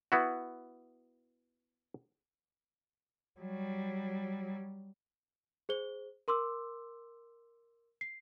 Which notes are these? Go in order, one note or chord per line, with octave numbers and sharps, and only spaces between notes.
B3 E4 F#4
F#3 G3
G#4 C5 G7
A#4 C6 D6 E6
C7